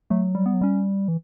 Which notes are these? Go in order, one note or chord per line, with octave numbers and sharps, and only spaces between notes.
F#3 A3
G3
G3 B3
F#3
G3 C#4
E3